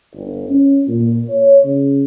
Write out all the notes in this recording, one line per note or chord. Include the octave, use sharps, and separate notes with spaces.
G1
C#4
A#2
C#5
C#3